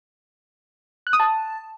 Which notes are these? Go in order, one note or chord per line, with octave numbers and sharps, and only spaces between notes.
F#6
D#6
A5